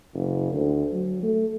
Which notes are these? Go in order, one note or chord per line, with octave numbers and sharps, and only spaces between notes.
F#1
D2
F#3
A3